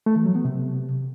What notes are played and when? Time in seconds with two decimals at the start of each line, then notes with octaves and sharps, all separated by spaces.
0.06 A3
0.16 E3
0.25 F#3
0.35 B3
0.45 C3